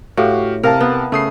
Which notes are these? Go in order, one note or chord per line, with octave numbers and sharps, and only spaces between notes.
A2 F#4 G4 F5
C3 A#4 F5 A5
B3
C#3 A3 D#6 C7